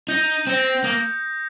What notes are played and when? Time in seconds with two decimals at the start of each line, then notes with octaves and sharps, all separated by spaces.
0.08 D#4 G6 A#6 C#7
0.47 C4 G6 A#6 C#7
0.84 A#3 D#6 A#6